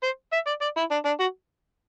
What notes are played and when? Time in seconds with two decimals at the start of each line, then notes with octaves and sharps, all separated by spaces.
0.03 C5
0.33 E5
0.47 D5
0.61 D5
0.77 E4
0.91 D4
1.05 D4
1.20 F#4